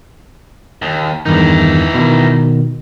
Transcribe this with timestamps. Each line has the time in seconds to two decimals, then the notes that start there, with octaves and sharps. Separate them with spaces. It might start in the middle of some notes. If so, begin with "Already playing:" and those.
0.82 D#2
1.26 E2 G2 D#3 E3 D#4
1.94 B2 D#3